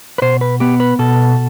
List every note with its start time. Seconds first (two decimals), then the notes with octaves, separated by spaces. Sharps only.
0.18 B4
0.22 B2 C5
0.41 B4
0.60 B3 G4
0.80 B4
0.99 B2 A4